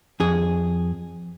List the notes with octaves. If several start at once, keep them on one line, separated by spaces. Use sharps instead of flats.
F2 G#4